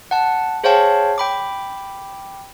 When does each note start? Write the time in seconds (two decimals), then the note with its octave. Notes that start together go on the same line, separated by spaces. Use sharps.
0.11 F#5 A5
0.64 G#4 C5 C#5 F5 G5 A5
1.18 G5 B5 D6